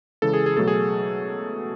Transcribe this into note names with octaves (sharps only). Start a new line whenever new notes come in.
C#3 E3 G#3 A4
G#4
G#4
B2 F#3 A3 A4
G#4